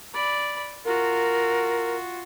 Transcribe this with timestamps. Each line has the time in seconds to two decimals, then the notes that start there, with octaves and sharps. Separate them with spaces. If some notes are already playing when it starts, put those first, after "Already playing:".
0.14 D5 B5
0.85 F4 F#4 A#4